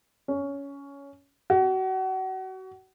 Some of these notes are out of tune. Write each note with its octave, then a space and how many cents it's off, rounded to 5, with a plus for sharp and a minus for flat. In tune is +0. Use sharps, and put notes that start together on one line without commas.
C#4 +15
F#4 +30